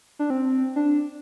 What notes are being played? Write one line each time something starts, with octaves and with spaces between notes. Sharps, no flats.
D4
C4
D4